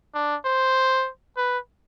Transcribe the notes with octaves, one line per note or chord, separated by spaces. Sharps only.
D4
C5
B4